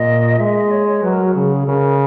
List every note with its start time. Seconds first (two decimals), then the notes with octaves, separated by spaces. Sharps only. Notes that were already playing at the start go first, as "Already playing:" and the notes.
Already playing: A#2 D#5
0.40 G#3 E5
0.56 D#5
0.71 C#5
0.88 C#5
1.03 F#3 B4
1.13 A#4
1.24 F#4
1.35 C#3 G#4
1.52 G#4
1.67 C#3 A#4